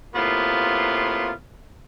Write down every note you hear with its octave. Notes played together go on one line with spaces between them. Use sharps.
A2 C3 A#3 B3 F4